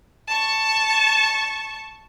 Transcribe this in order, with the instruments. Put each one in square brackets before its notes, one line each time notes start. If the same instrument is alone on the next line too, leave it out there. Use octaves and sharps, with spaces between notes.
[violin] A5 C#6